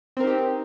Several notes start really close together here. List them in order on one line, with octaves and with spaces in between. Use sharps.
C4 A#4 D#4 G4